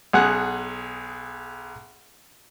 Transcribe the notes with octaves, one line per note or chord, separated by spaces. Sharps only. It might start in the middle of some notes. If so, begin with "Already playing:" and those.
B1 G#4 F#5